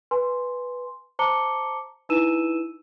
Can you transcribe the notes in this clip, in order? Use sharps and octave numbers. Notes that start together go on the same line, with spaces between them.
B4 G#5 C6
C5 A5 A#5 D6 C#7 G7
D#4 E4 B4 E6 D#7 E7